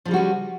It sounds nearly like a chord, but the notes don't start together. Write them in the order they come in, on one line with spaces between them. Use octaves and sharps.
F3 C#3 G3 F#4 C#4